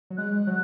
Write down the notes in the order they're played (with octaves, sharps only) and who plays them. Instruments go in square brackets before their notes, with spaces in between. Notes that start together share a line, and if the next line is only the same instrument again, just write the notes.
[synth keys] F#3
[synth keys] G#3 [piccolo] F#6
[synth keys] F#3